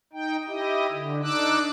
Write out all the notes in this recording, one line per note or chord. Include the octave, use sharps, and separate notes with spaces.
D#4 G5
E4 G4 D#5
D3
D4 D#4 D6 E6 F#6